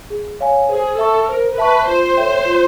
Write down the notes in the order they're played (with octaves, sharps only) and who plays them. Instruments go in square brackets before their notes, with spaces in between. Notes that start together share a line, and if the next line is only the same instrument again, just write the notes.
[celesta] G#4
C#5 F5 G#5
[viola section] G#4 [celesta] C5
[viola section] A4 [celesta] E5 A5 C#6
[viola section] A#4 [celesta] C5
[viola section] B4 [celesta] E5 A5 C#6
[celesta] F4 [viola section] C5
[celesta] A4 C#5 E5 G5
F4